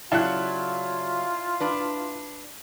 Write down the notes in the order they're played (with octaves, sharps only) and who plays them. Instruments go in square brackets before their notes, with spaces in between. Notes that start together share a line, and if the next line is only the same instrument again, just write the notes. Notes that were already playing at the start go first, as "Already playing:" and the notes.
[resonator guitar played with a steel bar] C#3 F#3 [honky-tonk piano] E4 F#6 [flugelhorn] F4 [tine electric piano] D5 F5 A5
[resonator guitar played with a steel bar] D4 B4